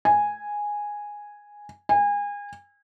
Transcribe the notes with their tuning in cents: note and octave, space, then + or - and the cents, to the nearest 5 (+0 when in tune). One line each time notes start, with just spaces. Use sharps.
G#5 -5
G#5 -30